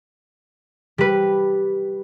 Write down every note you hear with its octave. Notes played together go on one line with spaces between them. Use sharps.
G3 B4